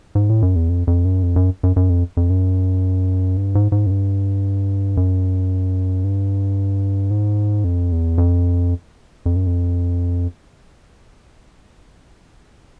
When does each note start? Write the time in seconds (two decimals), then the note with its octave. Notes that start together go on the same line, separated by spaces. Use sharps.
0.15 G#2
0.30 A2
0.42 F#2
0.55 E2
0.69 F2
0.87 F2
1.05 F#2
1.23 F2
1.36 F#2
1.63 F#2
1.76 F#2
1.90 F2
2.17 F2
2.30 F#2
3.37 G2
3.55 G#2
3.72 G#2
3.86 F#2
3.91 G2
4.97 F#2
6.04 G2
7.11 G#2
7.64 F2
7.92 E2
8.18 F2
9.26 F2
9.36 F#2
9.46 F2